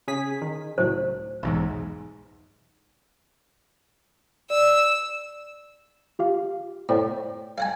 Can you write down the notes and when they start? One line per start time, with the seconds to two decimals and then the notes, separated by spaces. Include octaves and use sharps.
0.08 C#3 G#4 B6
0.42 D#3
0.78 C#2 A2 F#3 C5
1.43 B1 E2 G#2
4.50 D5 E6
6.19 F4 G4 F5
6.89 A2 C5 D5 G5
7.58 F5 F#5 G#5